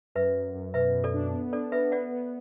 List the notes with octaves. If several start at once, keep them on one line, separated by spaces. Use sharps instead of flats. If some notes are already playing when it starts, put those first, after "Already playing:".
F#2 B4 E5
F#2
F#2
B2 B4 E5
B2
A4 D5
D4
B3
D4 A4 D5
B3 B4 E5
B3 D5 F#5
B3